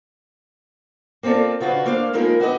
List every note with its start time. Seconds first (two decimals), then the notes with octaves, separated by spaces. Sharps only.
1.23 A#3 C4 F4 A4 D5
1.60 C#3 D4 F4 F#4 B4 C5
1.85 A3 A#3 D4 C5 F5
2.13 F3 G#3 A#3 D#4 E4 A#4
2.40 E4 F#4 G4 B4 C5 D#5